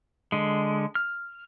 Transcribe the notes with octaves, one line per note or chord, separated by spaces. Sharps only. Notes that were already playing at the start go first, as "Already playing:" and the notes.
D3 G#3
F6